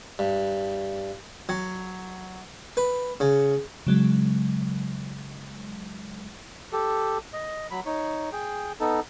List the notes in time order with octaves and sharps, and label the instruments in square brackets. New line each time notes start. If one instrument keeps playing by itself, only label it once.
[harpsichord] G2
F#3
B4
C#3
[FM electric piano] C#3 F#3 G#3
[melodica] G4 A4
D#5
F#3 B5
D#4 C#5
G#4 G5
B3 D#4 A4